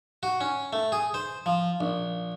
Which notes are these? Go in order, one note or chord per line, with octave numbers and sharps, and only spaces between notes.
F#4
C#4
A3
G#4
C5
F3
A#1